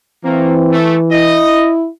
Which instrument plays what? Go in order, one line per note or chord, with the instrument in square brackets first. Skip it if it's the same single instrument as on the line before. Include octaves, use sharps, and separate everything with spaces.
[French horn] E3 [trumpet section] A3 A#3 [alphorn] C4
[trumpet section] A3
[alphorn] E4 [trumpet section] D#5